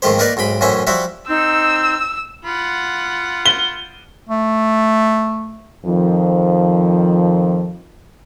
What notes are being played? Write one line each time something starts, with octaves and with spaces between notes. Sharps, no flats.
F2 G#2 D#3 A3 G4 C5
A#3 D#4 A#4 B4 D5 F5
B1 G#2 G5 B5
F#2 A2 E3 C#4 C5 E5
F3 G3 E4 F#4 E5
C4 D#4 E6
F4 F#5 B5
G7
A3
F2 D#3 F3